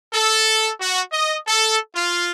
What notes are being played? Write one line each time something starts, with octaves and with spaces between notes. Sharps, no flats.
A4
F#4
D#5
A4
F4